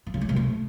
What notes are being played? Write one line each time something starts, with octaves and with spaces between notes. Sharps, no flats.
D#3
C#3
G#3
C3
A3